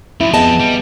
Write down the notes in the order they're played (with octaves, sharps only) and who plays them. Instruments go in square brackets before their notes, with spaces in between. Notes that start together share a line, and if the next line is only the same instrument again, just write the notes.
[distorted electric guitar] F#2 F3 [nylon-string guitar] E4
[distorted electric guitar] F2 [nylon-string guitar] B3 G#4 [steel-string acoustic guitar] D#5 A5
[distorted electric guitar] G3